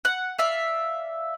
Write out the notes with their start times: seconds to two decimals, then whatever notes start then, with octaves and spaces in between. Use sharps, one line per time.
0.05 F#5
0.39 D5 E5 F5